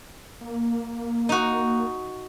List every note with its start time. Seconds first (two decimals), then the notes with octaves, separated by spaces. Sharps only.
0.41 A#3
1.29 D#4 F#4